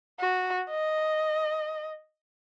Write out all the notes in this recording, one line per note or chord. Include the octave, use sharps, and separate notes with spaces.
F#4
D#5